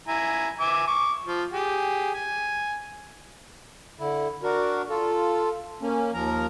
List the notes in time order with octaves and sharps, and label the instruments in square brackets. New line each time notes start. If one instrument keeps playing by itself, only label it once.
[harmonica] E4 G#5 A#5
E5 G#5 D6
C#6 D6
F3
G4 G#4
G#5
[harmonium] D3 E4
D4 F#4 A#4
F4 A4
A#3 C#4
D#2 F3 A#4 A#5